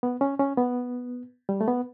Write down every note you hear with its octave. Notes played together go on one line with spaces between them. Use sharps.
B3
C#4
C#4
B3
G3
A3
B3